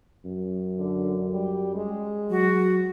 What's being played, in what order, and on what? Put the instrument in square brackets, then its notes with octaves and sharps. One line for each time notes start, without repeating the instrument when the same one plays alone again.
[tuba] F#2
[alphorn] D3
G3
G#3
[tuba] F#3 [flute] F#4